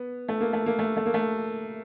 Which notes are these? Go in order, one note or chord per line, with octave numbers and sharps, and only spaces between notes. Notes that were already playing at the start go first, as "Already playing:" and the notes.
Already playing: B3
A3
A#3
A3
A#3
A3
A3
A#3
A3